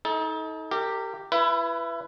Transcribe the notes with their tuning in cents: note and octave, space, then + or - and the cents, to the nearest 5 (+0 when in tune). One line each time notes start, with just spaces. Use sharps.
D#4 +35 A4 -15
G4 +0 A#4 -35
E4 +30 B4 +0